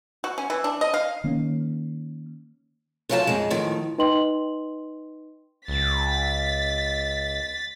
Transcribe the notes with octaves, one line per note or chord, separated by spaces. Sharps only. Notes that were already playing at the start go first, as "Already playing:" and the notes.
F#4
C#4
E3
D4
D#5
F5
D#3 A#3 C#4
C3 F3 F#3 F4 G#5 A5
F2 G#3
A2 D#3 F3
D#4 B4 D#5 G5 C6 F#7
C#2 A6 B6